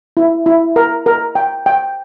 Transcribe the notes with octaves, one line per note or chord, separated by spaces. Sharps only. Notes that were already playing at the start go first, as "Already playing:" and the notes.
E4
E4
A#4
A#4
G5
G5